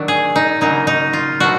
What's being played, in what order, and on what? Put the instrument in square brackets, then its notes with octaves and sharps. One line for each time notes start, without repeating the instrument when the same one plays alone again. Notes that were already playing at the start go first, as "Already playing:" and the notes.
Already playing: [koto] D#3 F#3 A3 D4
G#4
D#4
C#3 F#3 A#3 D#4
D#4
F4
B2 F#3 A3 F#4